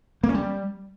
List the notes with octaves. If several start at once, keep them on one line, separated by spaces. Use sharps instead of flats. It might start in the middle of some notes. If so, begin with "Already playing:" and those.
A#3
C#4
G3